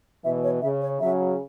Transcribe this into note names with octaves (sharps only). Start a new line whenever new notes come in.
B2 E3 E5
C#5
C#3 E5
C#5
C#3 F#3 E5